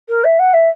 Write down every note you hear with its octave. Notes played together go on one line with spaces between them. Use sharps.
A#4
E5
F#5
E5